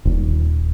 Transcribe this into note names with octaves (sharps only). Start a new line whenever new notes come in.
D#1